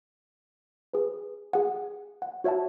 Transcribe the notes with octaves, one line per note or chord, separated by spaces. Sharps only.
G#4 B4
G#4 F#5
F#5
F#4 C#5 E5 F#5 A5